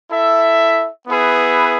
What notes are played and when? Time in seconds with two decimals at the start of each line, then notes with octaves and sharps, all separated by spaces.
0.11 E4 A4 E5
1.07 B3 E4 G#4 B4 E5